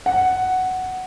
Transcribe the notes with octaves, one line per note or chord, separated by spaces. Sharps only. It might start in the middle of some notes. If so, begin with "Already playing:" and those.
F#5